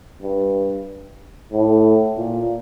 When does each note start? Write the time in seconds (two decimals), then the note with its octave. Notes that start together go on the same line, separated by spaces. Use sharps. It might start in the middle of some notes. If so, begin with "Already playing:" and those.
0.22 G2
1.52 A2
2.17 A#2